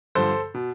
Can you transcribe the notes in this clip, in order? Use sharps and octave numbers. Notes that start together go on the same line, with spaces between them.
G2 D3 F3 A4 C5
B2